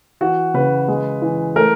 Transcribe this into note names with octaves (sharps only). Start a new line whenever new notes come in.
E3 F#4
C#3 B4
G#3
E3
A3 A#4